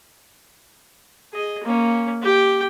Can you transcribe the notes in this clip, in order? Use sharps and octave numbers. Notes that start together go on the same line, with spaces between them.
G#4 D#5
A#3 C#4
G4 G5